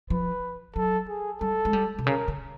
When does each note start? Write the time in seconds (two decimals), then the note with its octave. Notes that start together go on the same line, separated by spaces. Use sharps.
0.10 F3 B4
0.76 F#3 A4
1.08 G#4
1.41 G3 A4
1.65 G#3
1.73 G3
1.99 C3
2.06 C#3 A#4
2.28 C#3